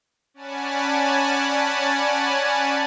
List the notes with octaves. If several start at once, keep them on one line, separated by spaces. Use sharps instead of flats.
C#4 D5 F#5 G#5 A5 B5